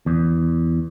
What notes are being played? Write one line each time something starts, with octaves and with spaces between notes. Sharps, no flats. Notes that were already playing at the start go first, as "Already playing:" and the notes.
E2